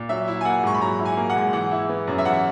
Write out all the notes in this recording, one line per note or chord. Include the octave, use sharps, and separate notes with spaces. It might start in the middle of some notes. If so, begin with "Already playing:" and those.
Already playing: A#2
F#3 E5
E4
G#5
A#3 F#5
G#2 C#6
B5
F#3 A#5
E4
G#5
A#3
F#5
G#2
E3 F#5
E4
B3
F#2
E5
E3 F#5